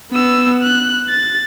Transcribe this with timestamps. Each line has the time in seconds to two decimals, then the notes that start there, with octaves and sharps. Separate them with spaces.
0.13 B3 E6
0.63 F#6
1.09 A6